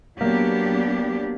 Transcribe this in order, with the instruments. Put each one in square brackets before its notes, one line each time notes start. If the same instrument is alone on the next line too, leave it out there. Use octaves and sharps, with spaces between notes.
[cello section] F#3 B3 D4 G4 [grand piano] A#3